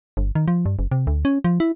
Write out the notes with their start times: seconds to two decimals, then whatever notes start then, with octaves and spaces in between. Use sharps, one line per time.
0.17 G1
0.35 D#3
0.48 F3
0.66 G2
0.79 F#1
0.91 C3
1.07 D2
1.25 C#4
1.44 F3
1.60 E4